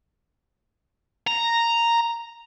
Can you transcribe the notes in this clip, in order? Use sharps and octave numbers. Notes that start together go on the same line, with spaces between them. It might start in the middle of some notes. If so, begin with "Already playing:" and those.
A#5